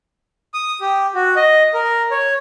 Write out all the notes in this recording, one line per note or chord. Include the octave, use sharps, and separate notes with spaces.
D#6
G4
F#4
D#5
A#4
C#5